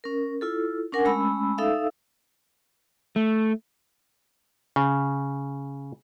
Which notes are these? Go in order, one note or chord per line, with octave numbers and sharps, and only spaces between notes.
C#4 A#4
E4 F4 A4
C#4 D4 A#4 F#5 G#5
G#3 A3 C#4 B5 E6
D#4 A4 E5 F5 E6
A3
C#3